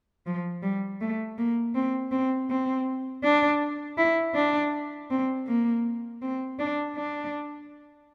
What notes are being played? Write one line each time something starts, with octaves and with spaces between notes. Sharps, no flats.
F3
G3
A3
A#3
C4
C4
C4
D4
E4
D4
C4
A#3
C4
D4
D4